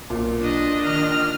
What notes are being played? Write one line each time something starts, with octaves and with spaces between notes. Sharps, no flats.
B1 A#2
D4 D#5
D#3 F6